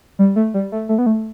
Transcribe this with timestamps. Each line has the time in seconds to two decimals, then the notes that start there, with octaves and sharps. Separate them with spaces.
0.19 G3
0.36 A3
0.54 G3
0.72 A3
0.89 A3
0.98 B3
1.06 A3